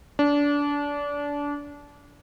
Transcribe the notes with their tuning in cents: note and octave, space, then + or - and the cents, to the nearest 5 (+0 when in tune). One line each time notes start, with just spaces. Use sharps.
D4 -25